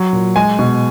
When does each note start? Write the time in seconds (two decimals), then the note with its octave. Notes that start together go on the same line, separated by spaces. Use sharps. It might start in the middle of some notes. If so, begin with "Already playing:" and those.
Already playing: F#3
0.13 A#2
0.36 G#3 G#5
0.59 B2